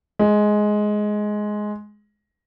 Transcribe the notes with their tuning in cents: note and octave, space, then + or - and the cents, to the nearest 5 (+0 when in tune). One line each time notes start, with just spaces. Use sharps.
G#3 +10